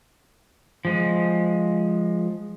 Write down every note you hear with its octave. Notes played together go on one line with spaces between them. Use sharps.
F3 G#3